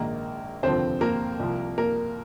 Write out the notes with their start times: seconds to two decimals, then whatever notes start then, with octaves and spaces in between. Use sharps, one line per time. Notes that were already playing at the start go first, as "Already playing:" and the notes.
Already playing: A#1 G#2 D#3 A#3 A#4
0.63 F1 D#2 D3 F3 C4 C5
1.01 A#3 A#4
1.39 C2 C3 F3
1.78 A#3 A#4